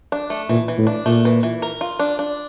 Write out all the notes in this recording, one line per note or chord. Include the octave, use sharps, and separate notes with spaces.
D4
A3
A#2 E3
E3
A2
D4
A#2 A3
E3
E3
A#4
F4
D4
D4